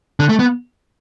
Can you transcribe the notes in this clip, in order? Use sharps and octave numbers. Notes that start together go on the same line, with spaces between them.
D3
A3
B3